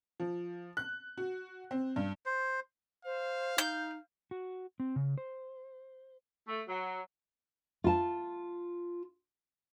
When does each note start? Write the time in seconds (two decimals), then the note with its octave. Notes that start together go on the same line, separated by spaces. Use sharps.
0.20 F3
0.77 F#6
1.17 F#4
1.71 C4
1.96 G2
2.26 C5
3.05 C5 F5
3.58 D#4 G6
4.31 F#4
4.80 C4
4.96 C#3
5.18 C5
6.48 A3
6.67 F#3
7.84 F4 A5